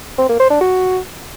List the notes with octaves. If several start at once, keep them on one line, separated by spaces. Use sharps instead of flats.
C4
A#3
C5
D4
F#4